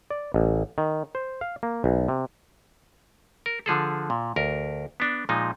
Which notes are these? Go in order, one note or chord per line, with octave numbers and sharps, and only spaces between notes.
D5
A1
D#3
C5
F5
A#3
B1
C3
A#4
D3 F3 G#4 A4
A#2
D2 A#4
B3 D4
A#2 F3 G#3 D#4